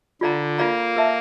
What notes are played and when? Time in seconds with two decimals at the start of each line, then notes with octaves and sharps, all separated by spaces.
0.21 D3 F4 A4 D5 F5 A#5
0.58 A#3 F4 A4 D5 F5 A#5
0.96 A#4 E5 A5